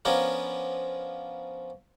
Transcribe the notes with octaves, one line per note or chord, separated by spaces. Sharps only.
F3 B3 C#4 D4 F4 A#4